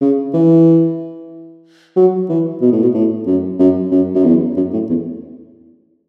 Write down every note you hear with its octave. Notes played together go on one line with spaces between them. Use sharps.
C#3
E3
F#3
E3
B2
A2
B2
A2
F#2
F#2
F#2
F#2
E2
F#2
A2
E2